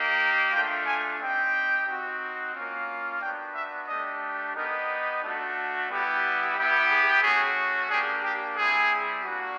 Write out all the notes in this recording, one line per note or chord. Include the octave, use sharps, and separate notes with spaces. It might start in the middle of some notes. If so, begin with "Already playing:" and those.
Already playing: A#3 D#4 G4
A3 D4 F4 G5
G#5
C4 D#4 G4 G5
C4 D#4 F#4
A#3 C#4 F4
B3 D4 F#4 G5
E5
A3 D4 G4 D#5
B3 D#4 G4 A#4
A3 D4 F#4
G3 B3 E4 G4
B3 E4 G4
G#4
A3 C#4 F#4 G#4
A#3 D4 G4 G#4
G4
G3 C4 E4 G#4
A#3 D4 F#4